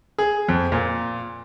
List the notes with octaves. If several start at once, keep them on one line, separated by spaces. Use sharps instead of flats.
G#4
F2
A#2